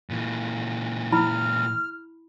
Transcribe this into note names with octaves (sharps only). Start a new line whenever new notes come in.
A#2 E3
E4 B5 F6